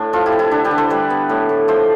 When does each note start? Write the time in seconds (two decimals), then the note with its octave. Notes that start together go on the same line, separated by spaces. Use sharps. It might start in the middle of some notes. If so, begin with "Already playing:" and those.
Already playing: A2 D4
0.13 F3 F4 A4
0.26 E4 G4
0.32 C4
0.39 E4
0.51 D3 D4
0.65 G4 B4
0.71 D3
0.78 A4 C5
0.90 G3 B4 D5
1.10 B3
1.29 A2
1.49 A2
1.68 F3 C5 E5